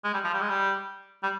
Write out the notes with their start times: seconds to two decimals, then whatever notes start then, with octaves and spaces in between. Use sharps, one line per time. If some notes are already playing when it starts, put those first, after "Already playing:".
0.04 G#3
0.14 G3
0.24 F3
0.33 G3
0.41 G#3
0.49 G3
1.23 G3